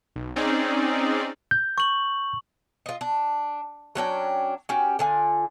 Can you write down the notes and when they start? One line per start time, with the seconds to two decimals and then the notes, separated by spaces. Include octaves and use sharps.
0.16 B1
0.36 C4 C#4 D#4 G#4 D5
1.51 G6
1.78 C#6 F#7
2.86 F4 D#5
3.01 D4
3.95 F#3 C#4 D4 G5
4.69 C#4 F#4 G4
4.99 D3 F4 G#5